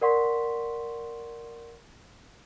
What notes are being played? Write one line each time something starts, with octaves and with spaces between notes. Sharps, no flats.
A#4 D5 F#5 C6 C#6 B6